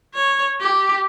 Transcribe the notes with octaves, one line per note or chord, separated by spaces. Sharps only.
C#5
G4